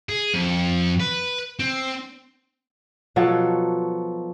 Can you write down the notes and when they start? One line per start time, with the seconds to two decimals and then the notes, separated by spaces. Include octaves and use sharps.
0.09 G#4
0.34 F2
1.00 B4
1.59 C4
3.16 B2 F3 F#3 A4